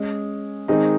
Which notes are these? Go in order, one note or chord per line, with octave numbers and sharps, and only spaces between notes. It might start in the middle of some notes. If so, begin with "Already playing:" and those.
Already playing: G#3 C#4 G#4
D#3 G#3 C4 D#4 G#4